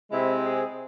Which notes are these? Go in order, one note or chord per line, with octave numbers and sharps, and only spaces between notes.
C3 G#3 C4 E4
G#4